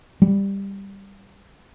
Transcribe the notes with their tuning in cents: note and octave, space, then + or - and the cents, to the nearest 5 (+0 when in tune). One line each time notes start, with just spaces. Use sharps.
G3 +10